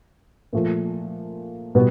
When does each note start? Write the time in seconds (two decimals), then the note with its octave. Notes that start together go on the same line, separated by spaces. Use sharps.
0.53 A#2 F3 A3
1.75 B2 G3 B3